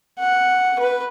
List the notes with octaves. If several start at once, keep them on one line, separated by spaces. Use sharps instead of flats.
F#5
B4